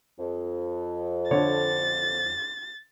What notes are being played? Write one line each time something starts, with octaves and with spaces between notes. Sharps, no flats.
F2
D3 C#5 A6